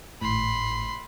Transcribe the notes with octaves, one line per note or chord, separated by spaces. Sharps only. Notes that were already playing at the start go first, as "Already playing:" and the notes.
G#1 A2 B5 C6